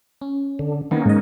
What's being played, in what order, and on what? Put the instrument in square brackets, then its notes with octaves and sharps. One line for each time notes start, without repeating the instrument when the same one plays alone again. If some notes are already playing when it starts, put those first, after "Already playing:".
[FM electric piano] C#4
[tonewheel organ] D3
[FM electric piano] D#3 B3 [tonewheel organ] A#3 C#4 D#4
[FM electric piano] G#2 D#5